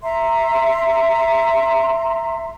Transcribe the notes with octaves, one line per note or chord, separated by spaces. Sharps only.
E5 A#5 C6